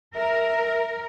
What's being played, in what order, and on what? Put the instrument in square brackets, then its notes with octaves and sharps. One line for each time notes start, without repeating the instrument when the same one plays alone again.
[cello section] A#4 [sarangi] E5